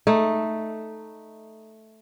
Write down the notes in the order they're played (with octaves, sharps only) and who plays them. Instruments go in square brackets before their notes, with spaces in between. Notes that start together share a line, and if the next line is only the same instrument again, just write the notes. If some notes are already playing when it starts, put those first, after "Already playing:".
[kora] A3 D#4